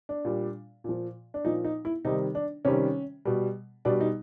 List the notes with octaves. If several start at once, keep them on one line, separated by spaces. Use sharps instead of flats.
D4
A#2 G3
A#2 F3
D4
A#2 F3 D#4
D#4
E4
C3 D#3 G3 D#4
D4
C3 D#3 G3 C#4
B2 G3
B2 G3 D4
D#4